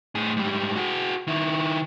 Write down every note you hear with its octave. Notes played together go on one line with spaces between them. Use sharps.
A2 G#4
G#2 G3
F#4 G#4
D#3 E4